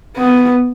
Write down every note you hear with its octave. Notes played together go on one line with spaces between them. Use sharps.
B3